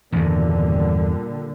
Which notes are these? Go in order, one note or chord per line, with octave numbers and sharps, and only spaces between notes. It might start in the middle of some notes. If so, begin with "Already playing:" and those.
E2 G2 A#2 D3 D#3 G3